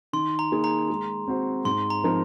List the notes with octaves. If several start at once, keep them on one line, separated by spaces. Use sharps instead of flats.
D#3 C6
A#5
A#3 D#4 G#4
A#5
G#3
C4 F#4 C5
G#2 C6
A#5
F3 C4 D#4 A#4